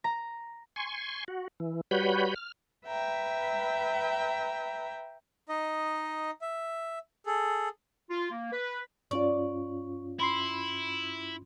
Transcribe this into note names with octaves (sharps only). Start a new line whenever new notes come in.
A#5
G#5 C6 C#6
F#4
E3
G3 F#4 B4 C#5 B5 G6
F6
B4 E5 G5 A#5
D#4 D#5
E5
G#4 A4
F4
A#3
B4
G2 C#4 F4 D5 C#6
E4 B5 C6 C7